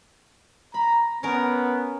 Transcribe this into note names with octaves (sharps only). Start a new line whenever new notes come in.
A#5 B5
B3 C#4 A#4